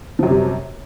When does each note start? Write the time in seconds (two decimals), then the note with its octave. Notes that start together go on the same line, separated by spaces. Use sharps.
0.19 F3
0.23 F#2
0.27 C3
0.31 G3